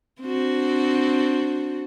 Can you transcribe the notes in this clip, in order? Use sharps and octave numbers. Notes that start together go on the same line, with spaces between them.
C4 D4 F#4